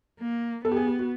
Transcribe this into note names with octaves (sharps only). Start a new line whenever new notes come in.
A#3
B3 A4
G4
G#4
G4
F#4